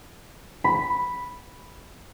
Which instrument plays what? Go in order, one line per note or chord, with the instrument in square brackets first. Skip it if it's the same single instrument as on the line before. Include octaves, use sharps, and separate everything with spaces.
[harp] B5